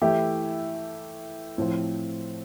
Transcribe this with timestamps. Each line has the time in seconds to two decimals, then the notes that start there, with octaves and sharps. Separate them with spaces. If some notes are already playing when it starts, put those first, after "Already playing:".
0.01 E3 A3 E4 G4
1.58 A2 F3 C4